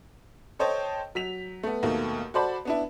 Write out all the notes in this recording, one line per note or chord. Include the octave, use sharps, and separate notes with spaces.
A4 C5 C#5 D#5 G5 A5
F#3 B6 F7
A3 B3
D#2 B2 A3 A#3
F#4 A4 C5 D5 A5 B5
B3 D4 E4